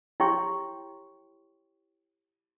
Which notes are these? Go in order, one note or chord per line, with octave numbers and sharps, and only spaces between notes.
E4 G4 C#5 G5 C6 C#6